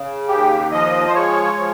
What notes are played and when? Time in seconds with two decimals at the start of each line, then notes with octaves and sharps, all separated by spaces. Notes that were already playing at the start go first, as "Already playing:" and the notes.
Already playing: C#3
0.28 D#2 G4
0.72 F3 D#5
1.07 C5
1.15 G#3 C#5
1.58 F3